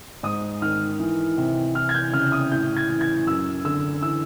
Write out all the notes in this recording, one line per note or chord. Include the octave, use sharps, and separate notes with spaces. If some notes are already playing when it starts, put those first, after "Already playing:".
G#2 D#6
D#3 F6
E3
C3
E3 F6
G#6
G6
C#3 F6
D#6
A2 G6
G#6
E3
G#6
F#2 E6
D3 E6
E3 E6